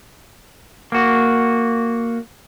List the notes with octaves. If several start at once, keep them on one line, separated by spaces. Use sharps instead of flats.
A#3 F#4